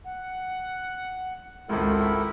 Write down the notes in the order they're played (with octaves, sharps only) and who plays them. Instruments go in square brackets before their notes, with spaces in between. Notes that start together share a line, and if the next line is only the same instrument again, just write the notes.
[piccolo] F#5
[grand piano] G#1 C#2 [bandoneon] E4 A4 A#4 [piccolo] B5